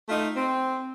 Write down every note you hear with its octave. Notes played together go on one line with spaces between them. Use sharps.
A3 D#4 F4
C4